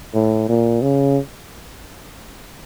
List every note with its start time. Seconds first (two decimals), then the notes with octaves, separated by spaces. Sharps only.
0.14 A2
0.49 A#2
0.82 C#3